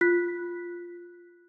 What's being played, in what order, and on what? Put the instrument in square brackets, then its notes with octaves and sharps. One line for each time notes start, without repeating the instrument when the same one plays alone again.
[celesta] F4 F#6 B6